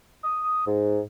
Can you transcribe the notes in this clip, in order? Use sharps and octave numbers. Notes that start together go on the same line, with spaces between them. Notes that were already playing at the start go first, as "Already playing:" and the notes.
D#6
G#2